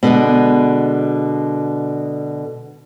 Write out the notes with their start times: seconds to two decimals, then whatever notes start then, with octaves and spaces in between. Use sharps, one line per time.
0.03 B2 D3 G#3 B3